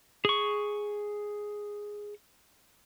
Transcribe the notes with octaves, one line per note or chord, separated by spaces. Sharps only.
G#4 C#6